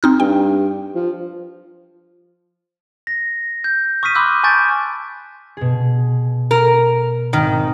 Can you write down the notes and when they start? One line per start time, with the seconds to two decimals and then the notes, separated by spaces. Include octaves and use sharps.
0.03 C4 D#4 F6
0.20 G2 G5
0.95 F3
3.07 A#6
3.64 G6
4.03 C#6 D#6 F6 B6 D#7
4.15 B5 C6 D6 E6 F#6 G6
4.44 G#5 A5 C#6 G6 A6 D7
5.57 B2 G#4
6.51 A#4
7.33 G#1 D#3